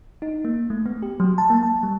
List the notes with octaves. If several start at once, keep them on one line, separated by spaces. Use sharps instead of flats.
D#4
A#3
A3
B3
G4
F#3
A5
A#3
A5
G3